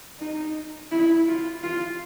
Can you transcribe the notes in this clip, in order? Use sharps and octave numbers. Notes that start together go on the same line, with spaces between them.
D#4
E4
F4
F4